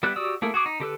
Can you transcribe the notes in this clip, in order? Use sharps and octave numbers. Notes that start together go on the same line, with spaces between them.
G3 B3 E4 G4 F#6
F#4 G4 D5 D#6 E6
A3 A#3 E4 G#4
F#4 G#4 D6
D#4
D3 G4 A4 B4